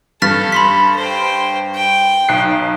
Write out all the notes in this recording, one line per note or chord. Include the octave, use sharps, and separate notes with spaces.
G2 A4 F6 A6 B6
B5 C6 B6
C5 G5
G5
B1 F#6 C7